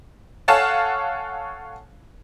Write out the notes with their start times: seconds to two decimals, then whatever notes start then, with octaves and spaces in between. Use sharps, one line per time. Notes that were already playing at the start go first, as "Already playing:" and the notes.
0.48 A4 C#5 F5 F#5 G#5 A5